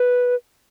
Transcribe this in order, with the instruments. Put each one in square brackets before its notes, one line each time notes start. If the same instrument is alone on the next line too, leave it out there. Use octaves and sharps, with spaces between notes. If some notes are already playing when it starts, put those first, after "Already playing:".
Already playing: [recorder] B4